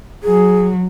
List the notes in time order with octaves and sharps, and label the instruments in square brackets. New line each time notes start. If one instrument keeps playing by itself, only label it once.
[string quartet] F#3 [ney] G#4